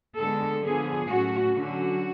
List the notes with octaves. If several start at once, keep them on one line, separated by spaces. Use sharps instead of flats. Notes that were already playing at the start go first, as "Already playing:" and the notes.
D3 G#3 B3 A4
D3 F3 B3 G#4
A2 F#3 A3 C#4 F#4
D3 F#3 C#4 F#4